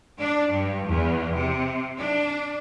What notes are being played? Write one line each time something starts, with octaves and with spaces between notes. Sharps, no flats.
D4
G2
E2
C3
D4